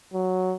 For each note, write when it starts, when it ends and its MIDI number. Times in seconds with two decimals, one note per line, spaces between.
0.13 0.54 54